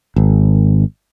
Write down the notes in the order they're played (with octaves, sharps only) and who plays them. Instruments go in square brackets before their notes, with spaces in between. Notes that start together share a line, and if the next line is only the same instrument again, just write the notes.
[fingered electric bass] G#1